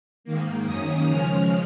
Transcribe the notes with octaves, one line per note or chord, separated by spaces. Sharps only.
G#2 D#3 A#3
F#2 D#3 A#3 C#4 D#6
C#3 F3 G#3 C#4 F6